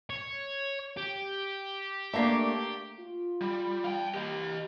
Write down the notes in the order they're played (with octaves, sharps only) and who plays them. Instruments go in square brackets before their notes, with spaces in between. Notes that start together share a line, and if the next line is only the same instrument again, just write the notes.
[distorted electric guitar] C#5
G4
[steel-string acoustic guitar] A3 A#3 D4
[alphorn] F4
[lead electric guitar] G3
F5 G5
G4 D#5